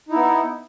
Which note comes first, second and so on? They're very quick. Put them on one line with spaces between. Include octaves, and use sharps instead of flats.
D#4 E4 B3